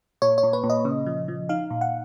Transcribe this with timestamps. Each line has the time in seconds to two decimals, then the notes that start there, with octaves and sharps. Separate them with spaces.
0.22 A#2 C#5
0.38 C#5
0.43 A#2
0.53 B4
0.64 A#2
0.70 D#5
0.85 C#3
1.06 F3
1.28 F3
1.49 D#4 F5
1.71 A#2
1.81 F#5